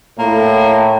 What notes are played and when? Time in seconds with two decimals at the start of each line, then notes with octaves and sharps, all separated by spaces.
0.19 A2 A#3